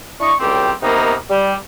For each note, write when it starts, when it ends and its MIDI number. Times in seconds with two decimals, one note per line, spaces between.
0.20 0.32 62
0.20 0.32 64
0.20 0.32 75
0.20 0.32 85
0.40 0.71 37
0.40 0.71 45
0.40 0.71 55
0.40 0.71 60
0.40 0.71 67
0.82 1.14 48
0.82 1.14 51
0.82 1.14 58
0.82 1.14 59
0.82 1.14 63
0.82 1.14 70
1.30 1.54 55